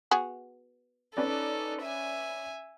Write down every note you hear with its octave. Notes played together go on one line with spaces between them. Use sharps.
B3 F#4 G#4
C#4 D#4 A4 B4 D5
E5 G#5